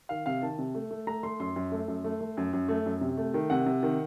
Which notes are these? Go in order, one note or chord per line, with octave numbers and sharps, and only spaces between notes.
D#3 F5
C3 F5
D#3 A5
C3
A3
A3
A3 A#5
A3 C6
F#2 C6
F#2
A3
F#2
A3
A3
F#2
F#2
A3
F#2
C3
A3
D#3
C3 F#5
C3
D#3